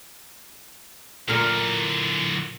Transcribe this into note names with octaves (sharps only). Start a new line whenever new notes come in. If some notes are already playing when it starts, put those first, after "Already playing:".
A#2 D3 E3 A#4